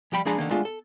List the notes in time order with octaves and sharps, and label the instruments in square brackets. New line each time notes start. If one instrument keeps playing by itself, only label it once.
[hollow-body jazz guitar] F3 G3 G5 B5
F3 G#3 D4 G#4 A#5 B5
D3 D#3 A#3
G#3 A3 B3 D4 F4
A4